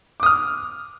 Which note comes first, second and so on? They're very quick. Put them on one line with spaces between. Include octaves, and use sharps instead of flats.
D6 D#6 F6